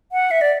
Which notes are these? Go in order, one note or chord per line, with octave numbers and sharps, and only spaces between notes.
F#5
E5
D5